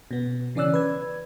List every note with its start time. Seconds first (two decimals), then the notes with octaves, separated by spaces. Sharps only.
0.11 B2 B3
0.55 C#3 E3 C#4 D5 E6 F#6
0.74 B4 G#6